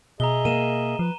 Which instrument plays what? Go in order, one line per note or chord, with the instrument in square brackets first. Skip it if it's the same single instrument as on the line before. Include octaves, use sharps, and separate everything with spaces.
[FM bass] B2 [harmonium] G#4 D#5 E5 [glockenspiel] A#5 G7
[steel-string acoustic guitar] A#3 [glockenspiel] D#7 E7
[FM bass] F3 [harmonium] B4